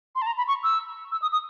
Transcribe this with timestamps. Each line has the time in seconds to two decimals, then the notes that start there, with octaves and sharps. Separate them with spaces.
0.15 C6
0.22 A5
0.27 A#5
0.38 B5
0.48 C#6
0.64 E6
1.12 E6
1.22 D#6
1.32 D#6